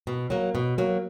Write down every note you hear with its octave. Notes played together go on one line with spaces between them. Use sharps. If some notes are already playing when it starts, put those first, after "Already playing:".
B2
F#3 A#3
B2
F#3 A#3